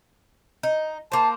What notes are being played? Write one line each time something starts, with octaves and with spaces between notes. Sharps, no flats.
D#4
A#3 C5 A5